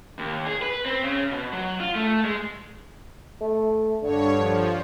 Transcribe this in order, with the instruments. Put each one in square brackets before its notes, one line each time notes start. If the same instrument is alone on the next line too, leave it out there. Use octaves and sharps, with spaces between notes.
[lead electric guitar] D#2
G#4
B4
C4
C#3
B2
F#3
F4
A3
G#3
[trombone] A3
[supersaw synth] G2 C#5 [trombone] D3
[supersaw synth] F3